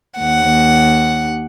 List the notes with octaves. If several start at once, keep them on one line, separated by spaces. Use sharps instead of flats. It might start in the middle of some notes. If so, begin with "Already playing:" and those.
D#2 F#5